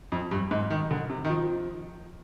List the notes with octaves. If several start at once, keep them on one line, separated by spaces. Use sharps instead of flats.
F2
G2
G#2
D#3
D3
C3
D#3
F3